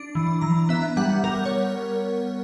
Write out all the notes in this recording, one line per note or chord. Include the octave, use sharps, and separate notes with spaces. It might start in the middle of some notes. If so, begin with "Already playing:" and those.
Already playing: D4
E3
E3 A#5
B3 E5
G3 F#5
G3 A#4
C#5